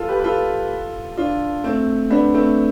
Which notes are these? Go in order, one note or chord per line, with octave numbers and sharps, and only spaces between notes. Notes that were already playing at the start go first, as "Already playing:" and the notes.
Already playing: F4 A4
G4 B4
B4
F4 A4
D4 F4
A3 C4
B3 D4
A3 C4